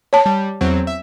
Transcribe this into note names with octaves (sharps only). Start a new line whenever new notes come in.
C#5 A5
G3
E2 F#3 C4
E5